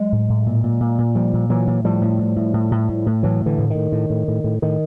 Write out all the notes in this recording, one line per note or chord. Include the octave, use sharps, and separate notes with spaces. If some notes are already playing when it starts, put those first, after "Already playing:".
Already playing: F#3 G#3
A2
A2
A#2
A#2
A#2
A#2
A#2 F3 G3
A#2
A#2 E3 F#3
A#2
A2 F3 G3
A2
A2
A2
A2
A2
A2
A2
A2 E3 F#3
A2
D3 E3
A2
A2 D#3
A2
A2
A2
A2
A2 D#3